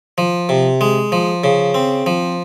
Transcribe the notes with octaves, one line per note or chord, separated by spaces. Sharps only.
F3
C3
G#3
F3
C#3
C4
F3